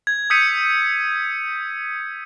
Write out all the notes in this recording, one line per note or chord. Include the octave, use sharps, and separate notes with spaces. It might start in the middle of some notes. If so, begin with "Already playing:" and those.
G#6
D#6 E6 G6 B6 C#7 D#7